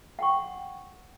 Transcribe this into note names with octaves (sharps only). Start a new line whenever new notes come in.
F#5 G5 C#6